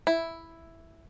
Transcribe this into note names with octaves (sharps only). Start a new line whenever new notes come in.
E4